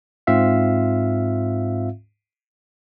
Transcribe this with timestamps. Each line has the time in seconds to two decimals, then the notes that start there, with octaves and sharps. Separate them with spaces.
0.27 G#2 C4 F4 E5 F5